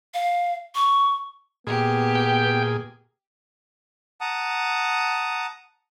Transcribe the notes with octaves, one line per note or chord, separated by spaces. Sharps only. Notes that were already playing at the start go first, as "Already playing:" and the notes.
F5
C#6
A#2 B3 G4 G#4
G5
F#5 A5 A#5 D#6